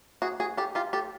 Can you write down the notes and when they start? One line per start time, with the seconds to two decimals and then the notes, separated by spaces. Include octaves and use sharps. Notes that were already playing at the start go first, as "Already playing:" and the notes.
0.22 F#4 G#4
0.40 F#4 G#4
0.57 G4 A4
0.75 F4 G4
0.93 G4 A4